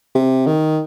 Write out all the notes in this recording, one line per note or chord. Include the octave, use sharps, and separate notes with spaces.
C3
D#3